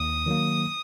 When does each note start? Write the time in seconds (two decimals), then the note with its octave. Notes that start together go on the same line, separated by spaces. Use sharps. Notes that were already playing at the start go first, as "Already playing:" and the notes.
Already playing: D#2 D#6
0.26 D#3 F#3 A#3